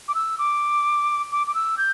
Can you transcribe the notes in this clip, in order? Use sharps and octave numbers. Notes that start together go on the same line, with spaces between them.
D6
E6
D6
D6
D6
E6
G6